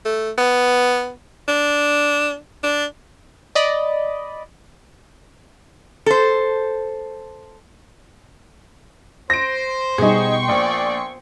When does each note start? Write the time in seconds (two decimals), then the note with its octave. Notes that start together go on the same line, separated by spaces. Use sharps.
0.05 A3
0.38 B3
1.48 D4
2.63 D4
3.55 D5 D#5 B5
6.06 A4 C5
9.30 C5 A#6 D7
9.98 B2 G3 D#4 G#4 G5 C6 C#6
10.49 A#1 F4 C5 D5